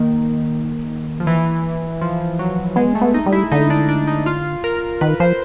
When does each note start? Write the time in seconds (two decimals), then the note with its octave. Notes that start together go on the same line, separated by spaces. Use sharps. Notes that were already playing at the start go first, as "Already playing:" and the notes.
Already playing: D#3 A#3
1.20 F3
1.27 E3
2.01 F3
2.39 F#3
2.76 G#3 B3
2.95 A3
3.01 B3
3.14 D#4
3.26 G3
3.32 E4
3.52 D3 D#4
3.70 D4
3.89 D4
4.08 D#4
4.26 F4
4.64 A#4
5.01 D#3 B4
5.20 F3 C5